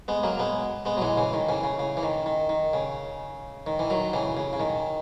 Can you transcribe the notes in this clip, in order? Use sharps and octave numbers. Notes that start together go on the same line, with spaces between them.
G#3 B3
F#3 A#3
G#3 B3
G#3 B3
F#3
E3 G#3
C#3 E3
D#3
C#3 E3
C#3
C#3
E3
D#3
D#3
D#3
C#3
D#3
E3
D#3 F#3
C#3 E3
C#3
C#3
D#3